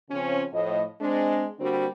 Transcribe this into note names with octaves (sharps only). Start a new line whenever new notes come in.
C#3 F3 C4 C#4
A2 F3 D#5
G#3 C4 D4
D3 G3 A#3 C4 D4 F#4